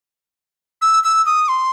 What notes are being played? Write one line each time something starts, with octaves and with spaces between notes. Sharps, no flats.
E6
E6
D#6
C6